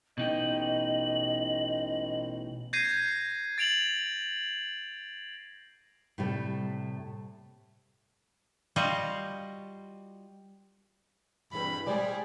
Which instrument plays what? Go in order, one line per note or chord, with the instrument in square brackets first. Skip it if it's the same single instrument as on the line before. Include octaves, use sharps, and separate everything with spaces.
[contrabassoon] A1 [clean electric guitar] B2 D#4 G4 [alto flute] D#5 [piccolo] F#7
[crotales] G6 G#6 A#6 C7 D#7
A6 D7 F7 F#7
[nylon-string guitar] A2 C3 G3 A3
[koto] G3 F4 F#4 D#5
[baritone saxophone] G2 [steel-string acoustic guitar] E3 C4 G#4 [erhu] B5
[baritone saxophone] G3 [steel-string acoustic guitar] G#3 C5 D5 [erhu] G#4